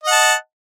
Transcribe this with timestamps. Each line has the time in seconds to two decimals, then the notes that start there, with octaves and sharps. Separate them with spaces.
0.04 D#5
0.08 F#5
0.11 A5